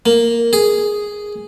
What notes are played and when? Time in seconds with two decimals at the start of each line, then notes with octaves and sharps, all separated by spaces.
0.06 A#3
0.53 G#4